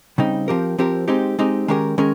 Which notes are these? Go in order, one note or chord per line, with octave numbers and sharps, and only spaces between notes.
C#3 G3 C4 D#4
F3 C4 G4 A#4
F3 C4 G4 A#4
G#3 C4 D#4 G4
G#3 C4 D#4 G4
D#3 G#3 C#4 G4 A#4
D#3 G#3 C#4 A#4